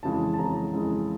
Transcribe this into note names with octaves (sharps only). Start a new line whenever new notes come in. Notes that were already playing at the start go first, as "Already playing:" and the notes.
F2 C#3 E3 G#3 A5
A5
F2 C#3 E3 G#3 A#5
F2 C#3 E3 G#3